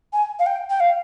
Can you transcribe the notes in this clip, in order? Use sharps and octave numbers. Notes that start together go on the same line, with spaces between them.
G#5
F5
G5
G5
F5